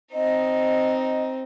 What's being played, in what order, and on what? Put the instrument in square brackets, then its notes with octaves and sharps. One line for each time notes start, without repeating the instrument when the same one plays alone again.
[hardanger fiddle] C4 D#4 [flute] D#5